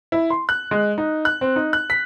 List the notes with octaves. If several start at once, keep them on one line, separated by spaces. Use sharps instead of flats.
E4
C6
F#6
G#3
D#4
F#6
C4
D#4
F#6
B6